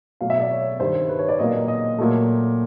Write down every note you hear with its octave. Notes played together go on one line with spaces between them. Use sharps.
B2 F#3 A3 F5
E5
D5
C#5
G2 D#3 G3 C5
B4
C#5
D5
A#2 F#3 A#3 D#5
D#5
A#2 F#3 A3